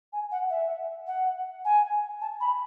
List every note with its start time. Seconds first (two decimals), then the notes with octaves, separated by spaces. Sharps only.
0.13 G#5
0.32 F#5
0.50 E5
1.07 F#5
1.65 G#5
2.21 A5
2.40 B5